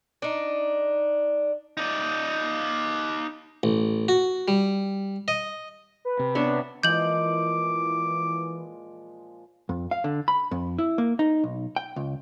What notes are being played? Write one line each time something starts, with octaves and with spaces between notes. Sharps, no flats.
D4 D#4
D#4 D5
A1
F#4
G3
D#5
B4
C3
B3 D4 C#5 E5
A#2 E3 F3 G#3 D6 G6 F#7
F2
F5
D3
B5
F2
E4
A#3
D#4
B1
G5
C#2